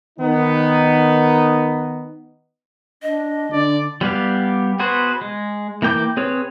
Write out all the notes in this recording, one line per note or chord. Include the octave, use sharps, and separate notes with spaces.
D#3 B3 D#4
D4 D#5
D3 D4 D5
G3 B3 G4 F5
B3 F#4 G#4 B4 C5
G#3
E3 A#3 G5 D6 G6
C4 G#4 B4 C#5